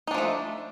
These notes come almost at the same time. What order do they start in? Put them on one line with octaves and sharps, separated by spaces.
D#4 D4 F3 A3